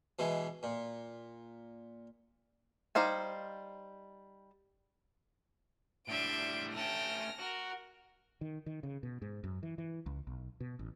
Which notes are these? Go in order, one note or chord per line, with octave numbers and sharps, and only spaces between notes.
B2 E3 G#3
A#2
G3 D#4 C5 F5 G#5
A2 G3 D4 E5 C6 D7
A3 C#4 G5 A5 F6 A#6
F#4 A#4
D#3
D#3
C#3
B2
G#2
F#2
E3
E3
C#2
B1
B2
A1